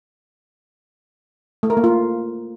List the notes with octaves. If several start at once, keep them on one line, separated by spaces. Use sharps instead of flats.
A3
A#4
A#3
F4